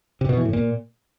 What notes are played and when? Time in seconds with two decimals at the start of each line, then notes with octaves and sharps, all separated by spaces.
0.21 C3
0.29 B2
0.37 E3
0.45 A2
0.53 A#2